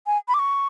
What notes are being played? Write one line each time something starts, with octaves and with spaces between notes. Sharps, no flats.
G#5
B5
D6
C#6